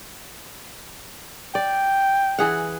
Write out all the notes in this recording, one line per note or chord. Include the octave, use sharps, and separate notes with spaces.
D5 G5
E3 G#4 F#5